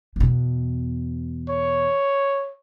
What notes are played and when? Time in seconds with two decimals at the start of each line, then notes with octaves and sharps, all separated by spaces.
0.16 E2 B2
1.49 C#5